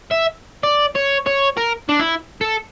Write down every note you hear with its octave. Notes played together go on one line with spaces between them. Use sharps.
E5
D5
C#5
C#5
A#4
D4
E4
A4